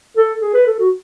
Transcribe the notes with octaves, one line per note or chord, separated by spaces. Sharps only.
A4
G#4
B4
A4
F#4